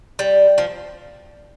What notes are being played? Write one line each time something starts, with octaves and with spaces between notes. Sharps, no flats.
G3
F3